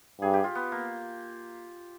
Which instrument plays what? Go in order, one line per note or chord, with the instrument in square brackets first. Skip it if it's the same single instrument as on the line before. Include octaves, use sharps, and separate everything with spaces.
[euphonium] G2 [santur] G#4
[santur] G4
F4
B3
A#3